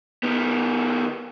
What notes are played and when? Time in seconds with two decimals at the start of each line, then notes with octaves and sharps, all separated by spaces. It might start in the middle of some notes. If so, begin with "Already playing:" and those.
0.23 D#3 B3